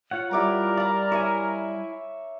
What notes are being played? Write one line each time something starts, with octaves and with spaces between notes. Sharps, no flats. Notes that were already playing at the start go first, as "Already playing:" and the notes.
F4 C#5 F#5
G3 E4 A#4 D5 A#5
D5 F5 A#5
E4 C#5 E5 G#5